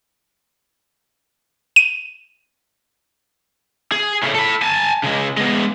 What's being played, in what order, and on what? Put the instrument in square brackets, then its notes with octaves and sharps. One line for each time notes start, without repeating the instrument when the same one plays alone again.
[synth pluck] D#7
[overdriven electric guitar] G#4
A2 C#3
A4 B5
G#5 A5
C#3 G#3
G#3 B3